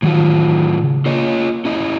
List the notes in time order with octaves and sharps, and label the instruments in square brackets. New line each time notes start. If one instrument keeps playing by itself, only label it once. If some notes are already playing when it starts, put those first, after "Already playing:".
[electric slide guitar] A2 F#3 F4 [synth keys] D#3 E3
[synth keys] C#3
[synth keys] A#3 [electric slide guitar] F4 C#5 D#5
[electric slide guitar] C#4 E4 D#5